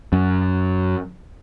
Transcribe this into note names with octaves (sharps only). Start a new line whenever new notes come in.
F#2